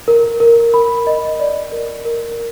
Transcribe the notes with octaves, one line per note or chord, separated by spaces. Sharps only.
A#4
A#4
B5
D#5
D5
A#4
A#4